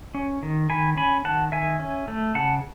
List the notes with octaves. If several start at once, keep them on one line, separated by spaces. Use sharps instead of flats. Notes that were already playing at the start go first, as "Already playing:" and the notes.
C#4
D#3
D#3 G#5 B5
C#4 G#5 B5
D#3 F#5 A5
D#3 E5 G#5
C#4
A3
C#3 F#5 A5